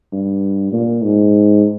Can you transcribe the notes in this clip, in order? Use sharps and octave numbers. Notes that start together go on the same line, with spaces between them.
G2
A#2
G#2